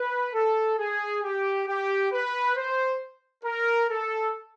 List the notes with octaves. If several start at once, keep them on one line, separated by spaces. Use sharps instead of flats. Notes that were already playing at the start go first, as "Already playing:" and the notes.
Already playing: B4
A4
G#4
G4
G4
B4
C5
A#4
A4